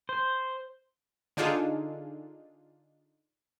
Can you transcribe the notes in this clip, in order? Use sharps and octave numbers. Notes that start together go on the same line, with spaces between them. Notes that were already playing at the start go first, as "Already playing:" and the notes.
C5
D3 D4 D#4 F4 G#4 A4